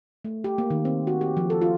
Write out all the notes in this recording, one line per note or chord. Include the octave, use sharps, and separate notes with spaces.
A3
G4
A#3
D#3
C4
F#4
G4
F3
A4
F4